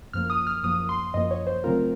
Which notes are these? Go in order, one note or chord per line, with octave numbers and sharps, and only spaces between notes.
F#2 F3 A#3 F6
D#6
F6
F#2 F3 A#3 D#6
C6
F#2 F3 A#3 D#5
C#5
C5
C#3 F#3 A3 C4 F4 A#4